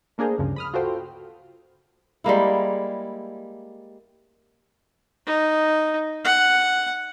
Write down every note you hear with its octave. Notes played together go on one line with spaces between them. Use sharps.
A3 A#3 D4 G#4 A#4 C5
D2 G2 C#3 F3
B5 D#6 F6
F4 F#4 A4 C5 G5
G3 G#3 A#3 E4
D#4
F#5